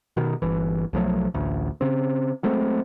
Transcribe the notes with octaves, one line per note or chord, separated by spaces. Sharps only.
B2 D#3
G1 E3
B1 F3 F#3 A3
A1 D2
C#3 C4
F#3 G#3 A3 C4